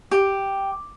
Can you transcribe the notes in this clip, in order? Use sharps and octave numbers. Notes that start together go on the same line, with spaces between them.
G4